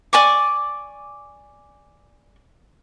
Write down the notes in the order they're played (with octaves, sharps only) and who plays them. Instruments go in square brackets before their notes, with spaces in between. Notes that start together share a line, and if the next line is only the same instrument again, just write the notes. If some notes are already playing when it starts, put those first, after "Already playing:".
[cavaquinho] D5 G#5 C#6 D6